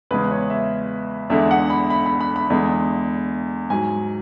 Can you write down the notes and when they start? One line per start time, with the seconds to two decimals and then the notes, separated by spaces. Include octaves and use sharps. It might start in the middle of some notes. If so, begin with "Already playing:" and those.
0.11 E2 C#3 G#3 B4
0.31 C#5
0.50 E5
1.30 E2 D3 G#3 E5
1.51 F#5
1.70 B5
1.90 B5
2.06 B5
2.21 B5
2.36 B5
2.50 E2 D3 G#3
3.70 G#2 F#3 G#5